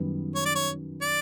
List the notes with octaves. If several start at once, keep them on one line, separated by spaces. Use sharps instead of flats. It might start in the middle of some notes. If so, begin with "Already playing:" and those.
Already playing: F#2 D#3 G3 B3
C#5
D5
C#5
D5